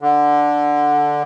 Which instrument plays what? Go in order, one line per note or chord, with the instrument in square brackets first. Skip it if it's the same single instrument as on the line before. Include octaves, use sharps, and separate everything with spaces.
[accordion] D3